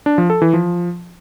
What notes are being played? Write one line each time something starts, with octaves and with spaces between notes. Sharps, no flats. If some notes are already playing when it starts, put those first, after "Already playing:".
D4
F3
A4
E3
F3